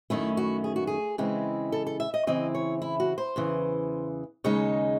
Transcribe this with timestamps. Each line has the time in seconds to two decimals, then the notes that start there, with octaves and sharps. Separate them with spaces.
0.10 F#2 D#3 A3 C#4 E4
0.37 F#4
0.64 G#4
0.76 F#4
0.87 G#4
1.18 C#3 E3 G#3 C4 E4
1.72 A4
1.87 A4
2.00 E5
2.14 D#5
2.27 C#3 E3 C4 E4 D#5
2.55 C#5
2.82 E4
3.00 F#4
3.18 C5
3.36 E2 C#3 E3
4.44 D#2 C#3 G#3 D#4 C#5